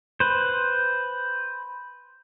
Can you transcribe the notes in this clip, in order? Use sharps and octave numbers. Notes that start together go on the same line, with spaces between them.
B4 C5